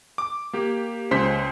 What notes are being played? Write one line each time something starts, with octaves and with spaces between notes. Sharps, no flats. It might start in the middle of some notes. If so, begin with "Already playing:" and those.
D6
A#3 G4
C#2 C#4 C5 C6 B6